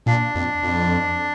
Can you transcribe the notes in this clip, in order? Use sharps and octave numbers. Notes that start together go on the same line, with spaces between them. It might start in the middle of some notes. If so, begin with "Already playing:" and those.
A#2 D4
F2
F2